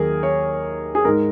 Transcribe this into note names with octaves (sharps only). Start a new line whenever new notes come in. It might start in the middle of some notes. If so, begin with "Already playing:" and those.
Already playing: D#2 D#3 F#3 A#3 G#4 A#4
C#5
G#4
G#2 G#3 A#4